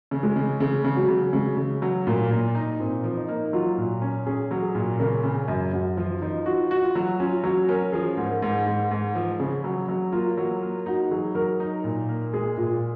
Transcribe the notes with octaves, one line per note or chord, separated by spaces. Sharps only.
C#3
G#3
C#3
C#3 G#3
C#3
F#3
C#3
C#3 G#3
C#3
F#3
A#2 A#3
A#2
D#4
A#2 C4
F3
D#4
A#3
F#3 F4
A#2
C#4
C#4 G#4
F#3
G#4
A#2
C#3 A#4
C#3
F#2
F#2 F#4
F3 F4
F3 D#4
F4 F#4
F#4
F4
F#3
C#4 F4
F#3 F#4
C#4 A#4
F3 G#4
G#2
A#4
G#2
G#2
G#2
F3
C#3 G#4
F#3
F#3
A#3 F4
F#3
A#3
D#4 F#4
F#3 G#4
F#3 A#4
D#4
A#2
A#3
G#3 G#4
A#2 F4